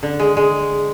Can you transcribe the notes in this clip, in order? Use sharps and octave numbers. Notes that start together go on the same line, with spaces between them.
D3
G#3
G#3